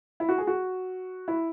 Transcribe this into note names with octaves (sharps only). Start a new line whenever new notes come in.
E4
F#4
G#4
F#4
E4